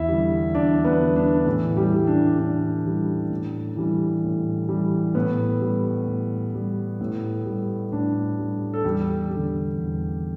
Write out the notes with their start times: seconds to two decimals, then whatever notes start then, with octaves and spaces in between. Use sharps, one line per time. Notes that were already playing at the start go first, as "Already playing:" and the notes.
Already playing: E2 E4 E5
0.08 D3 G3
0.55 E2 D4 D5
0.85 B3 B4
1.00 D3 G3
1.16 D4
1.46 A2 E3 E4
1.77 G3 G4
1.93 E3 G3
2.07 D4
2.39 A2 D4
2.84 E3 G3
3.30 A2
3.77 E3 G3
4.24 A2
4.69 E3 G3
5.15 A2 B3
5.61 G3
6.07 A2
6.54 G3
7.01 A2
7.46 G3
7.92 A2 D4
8.39 G3
8.74 A4
8.84 E2 G3 G4
9.30 D3 G3
9.77 E2